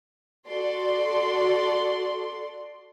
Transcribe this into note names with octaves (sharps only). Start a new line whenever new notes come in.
F#4 A4 D5 C6